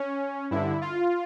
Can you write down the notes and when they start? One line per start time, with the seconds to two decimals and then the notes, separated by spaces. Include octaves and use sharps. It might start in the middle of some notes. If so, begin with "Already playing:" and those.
Already playing: C#4
0.51 G2 D3 E4
0.81 F4